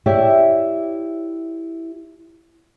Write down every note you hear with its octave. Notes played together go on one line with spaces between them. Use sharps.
E4 G4 C#5 D5 E5